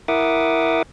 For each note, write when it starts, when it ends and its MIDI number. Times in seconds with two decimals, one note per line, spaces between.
0.08 0.83 64
0.08 0.83 70
0.08 0.83 76
0.08 0.83 78
0.08 0.83 86
0.08 0.83 87